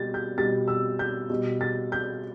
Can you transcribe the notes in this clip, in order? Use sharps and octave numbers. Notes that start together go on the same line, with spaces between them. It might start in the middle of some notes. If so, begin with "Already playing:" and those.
Already playing: B2 G3 A6
G6
B2 G3 A6
E6
G6
B2 G3
A6
G6